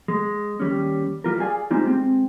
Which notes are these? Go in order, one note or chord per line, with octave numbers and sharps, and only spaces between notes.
G#3
D#2 G3 C#4
G3 F4 A#4
G#4 D5 F5 G#5
G3 G#3 C4 D#4 F4
G#3 C4